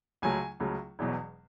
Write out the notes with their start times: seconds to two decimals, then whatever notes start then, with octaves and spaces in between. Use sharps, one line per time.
0.22 C#2 C#3 F#3 A3 G#5
0.60 C#2 C#3 F#3 A3
0.99 E1 E2 B2 F#3